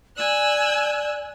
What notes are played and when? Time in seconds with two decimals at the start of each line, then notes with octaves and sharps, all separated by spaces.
0.18 D5 G#5 E6 F#6